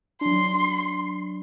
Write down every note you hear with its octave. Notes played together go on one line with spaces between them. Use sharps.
F#3 D4 C6